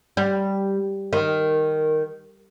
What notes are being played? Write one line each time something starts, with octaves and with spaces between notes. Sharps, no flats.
G3
D#3